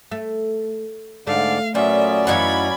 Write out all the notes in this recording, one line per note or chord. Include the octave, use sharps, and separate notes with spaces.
A3
G#2 D3 A3 D5 F5
A#2 F#3 B3 C#4 F4 D5 E5
F#2 E3 D#4 F4 F#5 B5 G#6